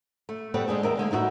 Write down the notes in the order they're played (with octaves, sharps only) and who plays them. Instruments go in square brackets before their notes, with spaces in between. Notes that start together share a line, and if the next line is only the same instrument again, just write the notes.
[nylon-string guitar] A3
G3 A3 B3 C4 B4
G#3 C4 D4 G#4
E2 A#4 E5
D3 G#3 A#3
A2 D#4 E4 F#4 E5